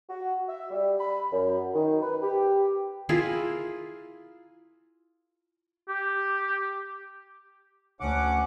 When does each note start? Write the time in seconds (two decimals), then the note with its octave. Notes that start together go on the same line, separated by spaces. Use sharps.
0.09 F#4
0.48 E5
0.71 G3
0.99 B5
1.32 F#2
1.74 D#3
2.01 B4
2.22 G4
3.09 E4 F4 G#4 A#4
5.88 G4
8.00 D2 C#4 F#5 D6